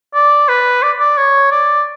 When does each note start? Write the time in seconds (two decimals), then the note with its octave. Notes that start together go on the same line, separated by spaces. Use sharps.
0.14 D5
0.49 B4
0.82 D5
0.99 D5
1.17 C#5
1.51 D5